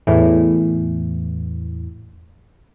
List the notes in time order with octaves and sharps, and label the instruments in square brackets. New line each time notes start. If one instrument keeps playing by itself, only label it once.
[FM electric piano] E2 A2 E3